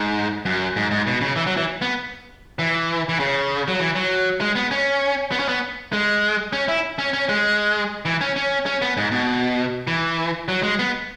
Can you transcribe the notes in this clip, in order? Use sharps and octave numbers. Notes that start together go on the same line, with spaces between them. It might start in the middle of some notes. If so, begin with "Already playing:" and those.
Already playing: G#2
F#2
G#2
G#2
B2
C#3
E3
F#3
E3
B3
E3
E3
C#3
F#3
E3
F#3
G#3
B3
C#4
B3
C#4
B3
G#3
C#4
E4
C#4
C#4
G#3
E3
C#4
C#4
C#4
B3
G#2
B2
E3
F#3
G#3
B3